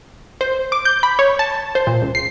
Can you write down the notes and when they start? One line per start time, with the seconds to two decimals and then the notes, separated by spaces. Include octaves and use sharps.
0.41 C5
0.72 D6
0.85 G6
1.03 B5
1.19 C#5
1.39 A5
1.75 C5
1.87 A#2
2.02 C#2
2.15 C7